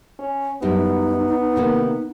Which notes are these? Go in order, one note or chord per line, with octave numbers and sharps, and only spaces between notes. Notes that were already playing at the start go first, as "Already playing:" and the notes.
C#4
F#2 G3 B3 D#4 E4
C3 D#3 A#3